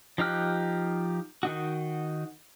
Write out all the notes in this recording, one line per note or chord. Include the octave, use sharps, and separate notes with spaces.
F3 D#4 G4 F6 F#6
D#3 D#4 F#4